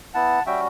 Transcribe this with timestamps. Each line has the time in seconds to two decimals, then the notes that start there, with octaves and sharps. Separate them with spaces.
0.14 B3 E4 F#5 A5
0.46 G3 C#4 F#4 E5 G5